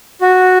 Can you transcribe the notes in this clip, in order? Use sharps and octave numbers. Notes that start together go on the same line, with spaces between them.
F#4